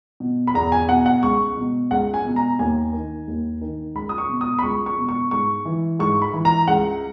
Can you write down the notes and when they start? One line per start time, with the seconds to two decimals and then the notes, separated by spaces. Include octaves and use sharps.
0.20 B2
0.47 B5
0.54 E2 A#5
0.72 G#5
0.89 B2 F#5
1.06 F#5
1.23 C#2 C#6
1.57 B2
1.91 C#2 F#5
2.14 G#5
2.25 B2
2.36 A#5
2.59 D#2 G#5
2.93 D#3
3.28 D#2
3.61 D#3
3.95 C#2 B5
4.09 D#6
4.18 C#6
4.29 B2
4.41 D#6
4.59 B5
4.63 C#2 C#6
4.86 C#6
4.97 B2
5.09 C#6
5.31 G#2 C#6
5.65 E3
5.99 G#2 C#6
6.22 B5
6.33 E3
6.45 A#5
6.68 C#2 F#5